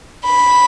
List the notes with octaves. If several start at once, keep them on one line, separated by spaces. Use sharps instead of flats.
B5